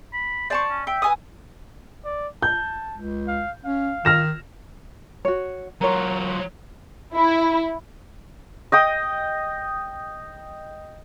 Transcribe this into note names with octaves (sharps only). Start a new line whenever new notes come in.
B5
C5 D5 A5 C#6
C#4
E5 G5
B4 G#5 D#6
D5
A5 G6
C#2
F5
C#4 F5
D#3 F6 A#6 E7
F#4 C#5
F#3 F4 A#4 C#5
E4
D#5 G5 D#6